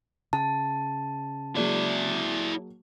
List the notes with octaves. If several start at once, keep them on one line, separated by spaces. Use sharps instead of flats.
C#3 A5
F#3 G#3 A#3 E4 D5